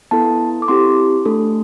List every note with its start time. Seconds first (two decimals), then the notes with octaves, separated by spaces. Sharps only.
0.11 B3 E4 A4 A5
0.62 D6
0.68 C4 E4 G4 C6
1.25 A3 D4 A4